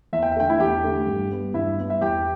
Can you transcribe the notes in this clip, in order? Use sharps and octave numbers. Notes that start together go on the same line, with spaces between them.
E2 E5
G5
E5
D3 A3 G5
E4 E5
E2 G4 G5
D3 A3
G2
G3 B3
G2 E4 E5
G3 B3
E5
E2 G4 G5